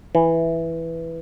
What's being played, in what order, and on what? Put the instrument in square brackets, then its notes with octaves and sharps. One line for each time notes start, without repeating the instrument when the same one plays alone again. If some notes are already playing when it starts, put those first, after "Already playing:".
[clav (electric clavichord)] E3